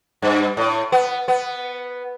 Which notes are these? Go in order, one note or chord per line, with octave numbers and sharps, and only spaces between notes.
G2
A2
B3
B3